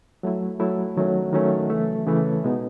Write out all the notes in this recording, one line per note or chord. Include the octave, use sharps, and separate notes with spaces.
F#3 A3 E4
F#3 A3 E4
D#3 F#3 A3 C#4
D#3 F#3 A3 C#4
C#3 E3 A3
C#3 E3 A3
B2 G#3 B3 D#4